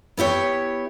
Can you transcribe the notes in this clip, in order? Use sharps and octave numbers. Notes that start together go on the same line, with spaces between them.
B3 E4 G4 C#5